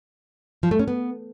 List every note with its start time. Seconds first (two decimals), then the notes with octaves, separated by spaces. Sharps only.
0.63 F3
0.71 A3
0.79 C#4
0.88 B3